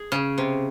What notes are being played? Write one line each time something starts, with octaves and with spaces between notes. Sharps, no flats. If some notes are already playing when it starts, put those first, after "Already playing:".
Already playing: G#4
C#3
C3